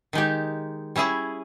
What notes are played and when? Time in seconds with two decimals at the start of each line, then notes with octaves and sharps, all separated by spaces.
0.13 D#3 G#3 D#4 G4
0.96 G3 C#4 E4 G#4